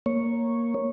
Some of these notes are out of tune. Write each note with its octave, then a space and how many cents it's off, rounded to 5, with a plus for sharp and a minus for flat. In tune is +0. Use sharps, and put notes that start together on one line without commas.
A#3 +0 C#5 -5